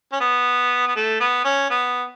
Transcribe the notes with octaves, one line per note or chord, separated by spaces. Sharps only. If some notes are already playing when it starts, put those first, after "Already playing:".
C#4
B3
B3
A3
B3
C#4
B3